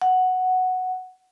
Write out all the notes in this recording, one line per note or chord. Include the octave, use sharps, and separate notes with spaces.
F#5